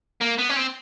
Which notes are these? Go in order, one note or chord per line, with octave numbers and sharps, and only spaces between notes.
A#3
B3
C#4
C4